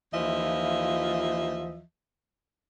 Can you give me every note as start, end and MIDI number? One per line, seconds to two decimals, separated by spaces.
0.14 1.80 39
0.14 1.80 52
0.14 1.80 53
0.14 1.80 65
0.14 1.80 75
0.14 1.80 76